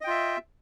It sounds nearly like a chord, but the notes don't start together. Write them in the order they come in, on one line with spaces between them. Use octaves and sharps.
D#5 G5 F4 E5